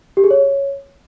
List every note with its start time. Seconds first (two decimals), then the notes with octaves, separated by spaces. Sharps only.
0.17 G4
0.24 G#4
0.31 C#5